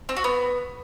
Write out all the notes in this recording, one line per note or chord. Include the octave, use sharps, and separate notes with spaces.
C4
F#4
B3